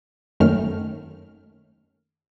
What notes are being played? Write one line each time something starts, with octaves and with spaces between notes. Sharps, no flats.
F#2 D#3 A3 A#3 C#4 F6